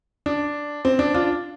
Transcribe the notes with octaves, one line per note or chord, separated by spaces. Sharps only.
D4
C4
D4
D4 F4